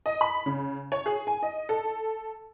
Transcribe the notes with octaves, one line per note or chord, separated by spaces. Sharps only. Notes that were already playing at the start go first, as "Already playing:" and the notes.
D#5
B5
C#3
C#5
G#4
G#5
D#5
A4